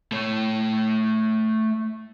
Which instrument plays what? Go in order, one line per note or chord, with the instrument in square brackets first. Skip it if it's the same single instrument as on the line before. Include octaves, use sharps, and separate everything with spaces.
[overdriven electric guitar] A3 C#5